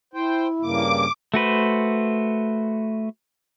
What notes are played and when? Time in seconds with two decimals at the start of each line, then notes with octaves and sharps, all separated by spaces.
0.14 E4 C5 G5
0.61 G2 C#3 A#3 D6
1.34 A3 F#4 B4 C5